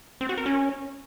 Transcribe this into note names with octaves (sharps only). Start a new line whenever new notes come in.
C4
F#4
A#4
C#4